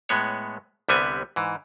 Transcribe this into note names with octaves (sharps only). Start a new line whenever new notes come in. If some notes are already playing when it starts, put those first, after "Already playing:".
A2 G#3 B3 C#5
C2 D3 G3 B3 C4 G#5
G#2 E3